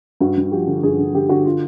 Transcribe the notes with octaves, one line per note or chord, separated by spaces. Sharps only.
G2 F#4
G2
F3 G4
D3
G2 G#4
D3
D3 G4
D3 F#4
F4